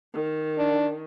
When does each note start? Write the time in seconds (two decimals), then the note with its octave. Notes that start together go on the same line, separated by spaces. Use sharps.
0.14 D#3
0.58 D4